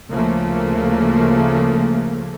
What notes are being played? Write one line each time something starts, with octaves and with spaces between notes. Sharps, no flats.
D2 C#3 F3 A3 A#3